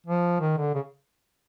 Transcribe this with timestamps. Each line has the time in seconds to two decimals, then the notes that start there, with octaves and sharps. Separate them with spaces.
0.07 F3
0.40 D#3
0.58 D3
0.75 C#3